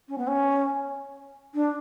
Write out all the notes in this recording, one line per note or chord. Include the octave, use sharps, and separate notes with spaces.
C#4
B3
C#4
D4